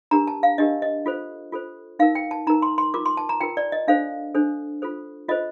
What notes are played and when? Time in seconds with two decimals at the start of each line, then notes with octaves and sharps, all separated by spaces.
0.11 D4 G4 A#4 A#5
0.27 A5
0.43 F5
0.58 D4 G4 A#4 D#5
0.82 D#5
1.06 F4 A4 C5
1.52 F4 A4 C5
1.99 D#4 A#4 F5
2.15 G5
2.31 A5
2.47 D#4 A#4 A#5
2.62 C6
2.78 C6
2.94 F4 A#4 D6
3.06 C6
3.17 A5
3.29 A#5
3.41 F4 A#4 G5
3.57 D5
3.72 D#5
3.88 D4 A4 C5 F5
4.35 D4 A4 C5
4.82 F4 A4 C5
5.29 F4 A4 C5 D#5